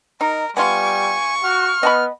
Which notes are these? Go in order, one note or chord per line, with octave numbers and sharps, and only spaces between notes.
D#4 A#4
G3 B3 F4 G#5 C#6
F#4 F6
B3 D#5 A5 B5